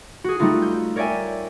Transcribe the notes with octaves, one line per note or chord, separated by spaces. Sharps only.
F#4 G#4
G3 A3 D#4 F4 F#4
G6
A#4 C#5 D5 E5 G5 G#5